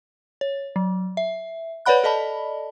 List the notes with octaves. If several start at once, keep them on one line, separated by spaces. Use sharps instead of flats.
C#5
F#3
E5
B4 C#5 D5 F#5 B5 F#6
A4 D5 D#5 A5 B5